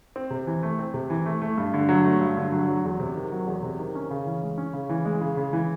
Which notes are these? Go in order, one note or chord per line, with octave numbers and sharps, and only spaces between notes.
C4
C3
E3
A3
C4
C3
E3
A3
A3
G2
D3
F#3
A3
G2
D3
F#3
F#3
E2
C3
D#3
F#3
E2
C3
D#3
C#4
C#3
E3
G#3
C#4
C#3
E3
G#3
C#3
C#3
E3